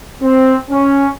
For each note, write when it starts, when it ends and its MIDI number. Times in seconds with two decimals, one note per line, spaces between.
0.22 0.55 60
0.70 1.07 61